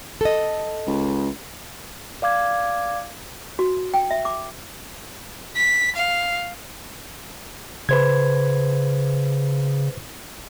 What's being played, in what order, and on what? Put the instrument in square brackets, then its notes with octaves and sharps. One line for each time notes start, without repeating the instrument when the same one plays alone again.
[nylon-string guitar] A4 D#5
[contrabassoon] C#2
[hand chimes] D5 F5 D6 G#6
[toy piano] F#4
G5
E5
D6
[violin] B6
F5
[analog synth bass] C#3 [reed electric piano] B4 C5 G#6